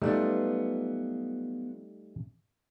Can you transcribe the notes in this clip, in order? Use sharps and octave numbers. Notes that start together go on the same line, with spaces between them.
F#3 G3 A3 B3 D#4 F4